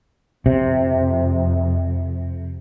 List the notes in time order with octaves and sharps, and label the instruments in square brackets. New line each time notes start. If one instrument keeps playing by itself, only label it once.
[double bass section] F2 [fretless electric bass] C3